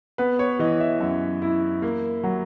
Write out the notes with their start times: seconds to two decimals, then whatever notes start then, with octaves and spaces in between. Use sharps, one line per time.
0.18 B3 B4
0.39 C#5
0.59 E3 D#5
0.80 E5
1.00 F#2 E5
1.42 E4
1.82 A#3
2.24 F#3